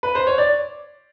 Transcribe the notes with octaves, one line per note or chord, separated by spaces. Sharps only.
B4
C5
C#5
D5